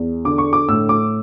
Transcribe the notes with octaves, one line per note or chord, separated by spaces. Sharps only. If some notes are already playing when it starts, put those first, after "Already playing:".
Already playing: E2
D3 D6
C#6
D6
A2 E6
D6